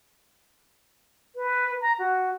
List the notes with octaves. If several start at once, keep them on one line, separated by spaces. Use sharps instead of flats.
B4
A#5
F#4